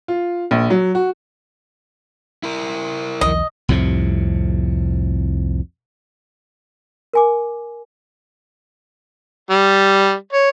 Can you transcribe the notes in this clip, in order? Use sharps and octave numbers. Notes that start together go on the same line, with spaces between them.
F4
A#1
F#3
F#4
E4 A#4
B1 E2 E3 D#5
C2 F2 A2 C3
A#4 G#5 D6
G3
C#5